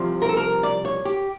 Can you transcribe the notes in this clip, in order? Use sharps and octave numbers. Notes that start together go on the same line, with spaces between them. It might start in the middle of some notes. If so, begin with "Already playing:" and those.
Already playing: C2 C3 F3
A#4
A4
A#4
D5
C#5
G4